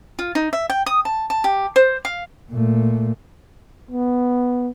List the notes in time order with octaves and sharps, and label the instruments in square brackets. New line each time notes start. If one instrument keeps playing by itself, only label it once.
[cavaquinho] F4
D#4
E5
G5
D#6
A5
A5
G4
C5
F5
[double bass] A#2 A3
[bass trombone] B3